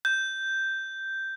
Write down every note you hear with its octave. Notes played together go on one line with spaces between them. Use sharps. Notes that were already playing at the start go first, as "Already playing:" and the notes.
G6